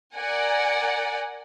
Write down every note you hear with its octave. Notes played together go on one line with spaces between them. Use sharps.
A#4 D5 F#5 G#5